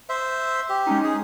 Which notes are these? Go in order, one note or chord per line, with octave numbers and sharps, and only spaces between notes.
C5 E5
G4
G#3 C#4 D#4
G#4